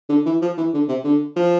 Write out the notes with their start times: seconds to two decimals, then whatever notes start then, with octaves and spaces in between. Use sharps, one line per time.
0.09 D3
0.26 E3
0.41 F3
0.57 E3
0.74 D3
0.88 C3
1.04 D3
1.36 F3